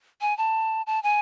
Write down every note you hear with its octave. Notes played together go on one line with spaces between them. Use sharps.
G#5
A5
A5
G#5